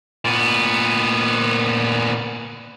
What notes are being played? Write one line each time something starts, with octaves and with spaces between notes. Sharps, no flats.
A#2 B3